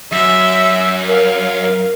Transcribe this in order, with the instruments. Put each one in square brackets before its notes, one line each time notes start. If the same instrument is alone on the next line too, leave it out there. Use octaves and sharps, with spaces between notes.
[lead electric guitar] F#2 [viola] E5
[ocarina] A#4 [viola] F5